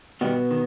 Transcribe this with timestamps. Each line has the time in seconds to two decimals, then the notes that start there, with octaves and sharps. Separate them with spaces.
0.21 G2 B2 D#3 G3 B3
0.51 D#3